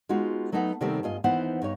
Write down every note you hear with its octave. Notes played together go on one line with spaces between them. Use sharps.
G#3 B3 D#4 F4 F#4
F#3 A3 B3 D#4 B4 F#5
C3 D#3 G3 A3 B3 C4
G2 F4 D#5 G#5
D#2 E3 B3 D#4 C5 F#5
G2 D#4 C#5